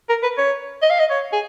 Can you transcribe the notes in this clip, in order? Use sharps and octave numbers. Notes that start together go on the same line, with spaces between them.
A#4
B4
C#5
D#5
F5
D#5
C#5
G#4